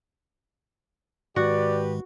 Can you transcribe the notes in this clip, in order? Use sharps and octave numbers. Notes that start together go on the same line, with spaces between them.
G#2 D#3 G#3 F#4 G4 B4 D5